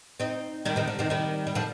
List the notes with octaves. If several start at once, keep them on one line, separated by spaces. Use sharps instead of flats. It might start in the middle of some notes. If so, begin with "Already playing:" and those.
C4 D#4
D#3 G3
C3 D#3
D3
C3 D#3
D#3 G3
G3
D3 F3